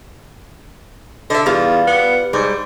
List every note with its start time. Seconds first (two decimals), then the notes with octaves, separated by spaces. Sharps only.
1.30 D3 D#5 E5
1.46 E2 G3 F4
1.87 B3
2.33 G#2 G3